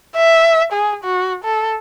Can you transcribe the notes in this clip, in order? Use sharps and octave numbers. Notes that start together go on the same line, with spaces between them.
E5
G#4
F#4
A4